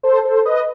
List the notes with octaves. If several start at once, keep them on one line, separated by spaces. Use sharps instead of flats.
A4 C5
A4 C5
B4 D#5